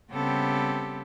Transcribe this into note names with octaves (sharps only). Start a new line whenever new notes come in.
C#3 G3 B3 C4 G4 A4